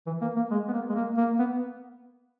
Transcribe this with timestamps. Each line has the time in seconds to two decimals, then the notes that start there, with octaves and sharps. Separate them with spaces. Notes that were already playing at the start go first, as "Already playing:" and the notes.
0.07 E3
0.21 A#3
0.36 A#3
0.51 G#3
0.68 B3
0.73 A#3
0.90 G#3
0.95 A#3
1.17 A#3
1.39 B3